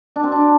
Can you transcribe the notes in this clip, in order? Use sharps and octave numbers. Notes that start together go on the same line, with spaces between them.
D4
C4
D4